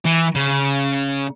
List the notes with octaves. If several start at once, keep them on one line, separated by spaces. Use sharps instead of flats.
E3
C#3